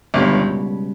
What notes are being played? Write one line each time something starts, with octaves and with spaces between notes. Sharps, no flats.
G1 C#2 G2 B2 G3